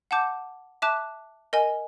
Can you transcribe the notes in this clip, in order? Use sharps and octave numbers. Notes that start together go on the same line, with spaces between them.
F#5 A5 D6 G6
E5 A5 D6 F#6
A#4 D#5 G#5